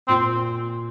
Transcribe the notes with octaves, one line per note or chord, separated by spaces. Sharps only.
A#2 C4